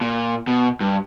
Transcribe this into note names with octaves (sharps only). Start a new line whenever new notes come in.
A#2
B2
G2